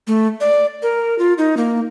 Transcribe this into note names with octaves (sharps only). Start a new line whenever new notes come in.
A3
D5
A#4
F4
D#4
A#3